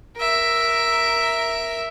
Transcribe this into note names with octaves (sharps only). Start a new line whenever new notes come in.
A#4 E5